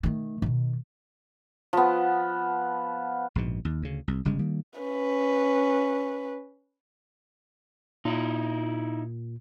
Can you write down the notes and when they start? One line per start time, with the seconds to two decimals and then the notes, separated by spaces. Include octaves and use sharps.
0.03 D#3 A3
0.42 B2 D#3
1.73 F3 B3
3.35 A#1 G#2 B2
3.65 D#2
3.82 D2 C#3
4.08 C2
4.25 G1 C#3 G3 G#3
4.39 D#3 G3 A#3
4.80 C#4 B4
8.05 A#2 D#4 E4